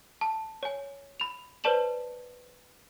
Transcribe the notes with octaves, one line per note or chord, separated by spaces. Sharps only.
A5
C#5 G#5
B5 F7
B4 C5 D5 A5 E7 F#7